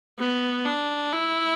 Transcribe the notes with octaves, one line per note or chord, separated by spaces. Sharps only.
B3
D4
E4